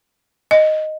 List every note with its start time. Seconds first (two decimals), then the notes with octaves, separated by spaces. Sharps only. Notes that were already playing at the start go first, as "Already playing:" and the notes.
0.51 D#5